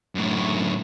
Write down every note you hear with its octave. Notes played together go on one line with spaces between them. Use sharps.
F#2 A2